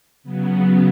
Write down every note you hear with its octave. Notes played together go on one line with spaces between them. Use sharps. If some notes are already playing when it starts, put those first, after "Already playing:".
C#3 F#3 B3